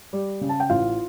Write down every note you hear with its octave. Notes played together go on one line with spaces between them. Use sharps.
G3
C#3
A5
G5
A1 F4 F5